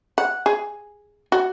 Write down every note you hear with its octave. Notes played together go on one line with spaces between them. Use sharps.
F#5
G#4
F#4